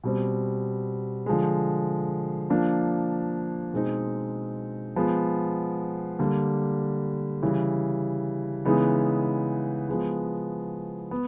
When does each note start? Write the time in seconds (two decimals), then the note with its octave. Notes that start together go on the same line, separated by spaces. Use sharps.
0.04 B2 G3 C4
1.26 D3 F3 G#3
2.50 F3 A#3 D4
3.73 B2 G#3 C4 D#4
4.96 F3 G#3 B3
6.19 D3 G3 A#3
7.42 C#3 E3 G3
8.65 C#3 E3 G#3 B3 D#4
9.89 F3 G#3 B3
11.11 B3